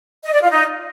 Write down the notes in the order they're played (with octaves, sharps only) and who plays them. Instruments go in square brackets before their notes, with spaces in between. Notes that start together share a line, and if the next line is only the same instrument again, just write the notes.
[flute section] D#5
D5
F4
D#4